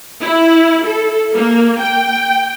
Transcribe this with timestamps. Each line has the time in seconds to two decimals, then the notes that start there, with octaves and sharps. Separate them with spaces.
0.24 E4
0.86 A4
1.35 A#3
1.80 G5